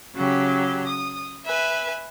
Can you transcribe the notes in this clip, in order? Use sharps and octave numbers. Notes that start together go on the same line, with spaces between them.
C#3 F#3 G4
D#6
B4 E5 G#5